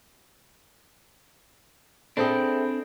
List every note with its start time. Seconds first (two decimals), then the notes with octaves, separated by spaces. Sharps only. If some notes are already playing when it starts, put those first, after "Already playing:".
2.17 C4 D4 G#4 A4 C5 E5 G5 B5